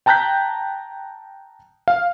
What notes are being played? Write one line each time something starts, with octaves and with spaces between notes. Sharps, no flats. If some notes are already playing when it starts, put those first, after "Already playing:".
G5 A5 A#5 F#6 G6 B6
F5